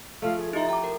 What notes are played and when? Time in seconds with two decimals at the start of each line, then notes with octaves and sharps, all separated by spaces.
0.22 F3 A3 F5
0.38 G#4
0.53 D#4 E4 G4 E5
0.69 G5 A#5 D6
0.84 A#4